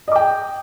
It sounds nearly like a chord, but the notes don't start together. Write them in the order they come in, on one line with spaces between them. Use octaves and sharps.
D#5 D6 G5